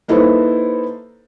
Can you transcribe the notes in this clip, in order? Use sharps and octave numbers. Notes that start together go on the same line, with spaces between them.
A#3 D#4 E4 A4 B4 C5